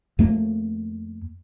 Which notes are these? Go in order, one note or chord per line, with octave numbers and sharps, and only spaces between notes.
F2 A3 A#3